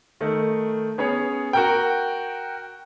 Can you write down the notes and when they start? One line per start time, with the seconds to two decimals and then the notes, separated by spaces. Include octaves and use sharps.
0.21 D#3 A3
0.98 B3 C#4 G#4 C#5
1.53 F#4 A#4 G5